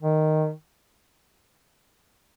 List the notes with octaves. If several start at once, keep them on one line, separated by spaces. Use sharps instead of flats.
D#3